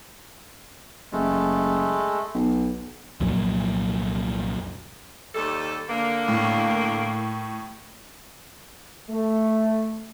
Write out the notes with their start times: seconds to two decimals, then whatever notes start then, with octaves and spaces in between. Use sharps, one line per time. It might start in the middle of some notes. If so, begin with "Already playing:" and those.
1.12 F#1 G#3 A3
2.35 B1
3.20 C2 F2 A#2 F#3
5.35 D#2 G3 A4
5.89 D3 A#3
6.28 A2
9.10 A3